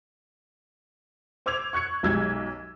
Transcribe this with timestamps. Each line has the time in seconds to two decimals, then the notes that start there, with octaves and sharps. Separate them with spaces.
1.46 C5 D6 E6 G#6 F7
1.73 C#6 F#6 G#6 C#7
2.03 B1 F#2 G#3 G4 E6 G#6